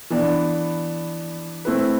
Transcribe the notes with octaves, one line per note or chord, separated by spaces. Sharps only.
E3 B3 D4
A3 C4 E4 B4